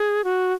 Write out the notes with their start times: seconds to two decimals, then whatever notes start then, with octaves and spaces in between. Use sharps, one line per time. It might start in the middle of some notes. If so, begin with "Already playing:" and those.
Already playing: G#4
0.24 F#4